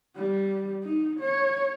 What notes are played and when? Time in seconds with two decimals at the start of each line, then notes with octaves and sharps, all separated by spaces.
0.16 G3
0.83 D#4
1.20 C#5